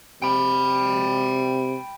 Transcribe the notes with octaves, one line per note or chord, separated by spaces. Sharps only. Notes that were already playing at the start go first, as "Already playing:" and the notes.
C3 G5 B5